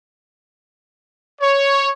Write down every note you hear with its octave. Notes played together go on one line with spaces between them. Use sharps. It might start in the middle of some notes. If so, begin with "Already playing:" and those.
C#5